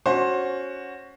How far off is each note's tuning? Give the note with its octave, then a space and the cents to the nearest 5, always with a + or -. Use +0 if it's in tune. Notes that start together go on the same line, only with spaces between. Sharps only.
C#4 +10 F#4 +0 C5 +20